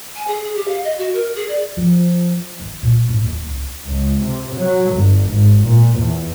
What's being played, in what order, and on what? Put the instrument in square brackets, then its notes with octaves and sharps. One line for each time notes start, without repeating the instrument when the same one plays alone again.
[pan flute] G#5
G#4
G#4
G4
F5
D#5
F#4
A#4
G#4
D5
[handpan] F3
[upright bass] D#3
A#2
A2 C4
D#2
C#2
[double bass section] C#2
C3
F#3
G1
G#1
A#2
E2